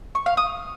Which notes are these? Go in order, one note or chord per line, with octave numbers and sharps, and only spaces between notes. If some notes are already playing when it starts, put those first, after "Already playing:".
C#6
F5
D#6